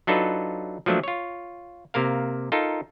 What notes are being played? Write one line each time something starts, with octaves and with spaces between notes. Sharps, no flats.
F#3 D4 D#4 F4 A4 B4
F3 F#3 A3 A#3 D4
F4 C#5
C3 A#3 A#4 F5
D#4 F4 A4 A#4